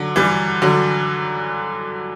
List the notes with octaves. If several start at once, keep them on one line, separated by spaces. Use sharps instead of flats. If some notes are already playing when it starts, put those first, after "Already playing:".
Already playing: D3 F#3
E3 G3
D3 F#3